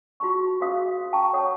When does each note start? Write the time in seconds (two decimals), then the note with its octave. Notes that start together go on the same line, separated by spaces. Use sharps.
0.20 F4 F#4 G#4 A5 B5 C#6
0.60 F4 F#4 G#4 C5 F5 D#6
1.13 G5 A5 A#5 C#6
1.33 A4 C#5 F#5 C#6 D#6